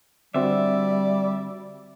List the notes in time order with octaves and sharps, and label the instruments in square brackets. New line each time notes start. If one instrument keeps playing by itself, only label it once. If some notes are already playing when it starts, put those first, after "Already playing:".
[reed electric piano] D3 C4 F#4 [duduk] G3 [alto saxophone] D5 [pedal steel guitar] E5